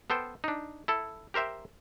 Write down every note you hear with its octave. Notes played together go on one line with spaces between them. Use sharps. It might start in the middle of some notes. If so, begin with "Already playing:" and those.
B3 A4 C5 G5
D4 D#4
E4 A4
G4 A#4 C5 E5 G5